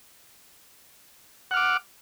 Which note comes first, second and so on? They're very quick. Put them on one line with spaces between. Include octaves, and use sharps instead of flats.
F#5 F6 D6